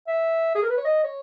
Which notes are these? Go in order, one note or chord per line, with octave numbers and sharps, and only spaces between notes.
E5
G#4
A#4
B4
C#5
D#5
C#5